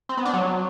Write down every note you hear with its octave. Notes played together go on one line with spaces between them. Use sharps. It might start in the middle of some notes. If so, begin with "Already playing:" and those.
C4
B3
D4
F#3